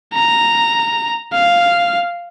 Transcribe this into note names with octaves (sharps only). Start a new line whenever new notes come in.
A#5
F5